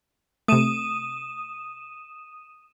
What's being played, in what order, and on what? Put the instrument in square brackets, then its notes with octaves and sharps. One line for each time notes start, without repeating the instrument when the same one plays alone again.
[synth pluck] C3 A3 [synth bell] D#6 D#7 E7